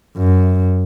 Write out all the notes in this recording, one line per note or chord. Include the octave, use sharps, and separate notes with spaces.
F#2